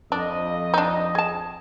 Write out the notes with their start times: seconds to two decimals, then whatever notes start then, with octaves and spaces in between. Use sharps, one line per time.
0.12 F2 D4 D#5
0.74 D4 D#4
1.15 G#4 A5